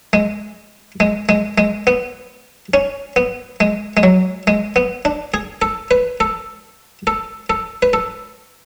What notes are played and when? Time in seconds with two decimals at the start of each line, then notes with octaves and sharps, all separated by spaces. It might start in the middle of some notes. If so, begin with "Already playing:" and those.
0.13 G#3
1.00 G#3
1.29 G#3
1.58 G#3
1.87 B3
2.74 C#4
3.16 B3
3.60 G#3
3.97 G#3
4.03 F#3
4.47 G#3
4.76 B3
5.05 D4
5.34 G#4
5.62 A4
5.91 B4
6.20 A4
7.07 A4
7.50 A4
7.82 B4
7.93 A4